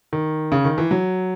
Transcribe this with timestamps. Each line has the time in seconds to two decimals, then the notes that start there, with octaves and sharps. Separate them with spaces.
0.13 D#3
0.52 C#3
0.65 D#3
0.78 E3
0.91 F#3